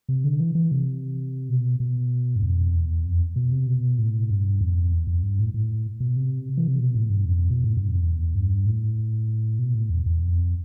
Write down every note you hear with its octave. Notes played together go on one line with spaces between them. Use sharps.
C3
D3
E3
E3
C3
B2
B2
G2
F2
E2
F2
B2
C3
B2
A2
G2
F2
E2
F2
G2
A2
A2
B2
C3
E3
C3
B2
A2
G2
F2
B2
A2
G2
F2
E2
G2
A2
B2
A2
E2
E2
F2